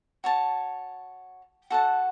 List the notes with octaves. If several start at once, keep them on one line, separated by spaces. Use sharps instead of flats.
F#4 C#5 A5
F#4 A4 F#5 A5